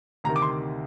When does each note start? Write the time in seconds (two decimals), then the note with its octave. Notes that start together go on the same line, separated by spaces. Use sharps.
0.24 D2 C3 D#3 A#5
0.36 D6
0.42 C6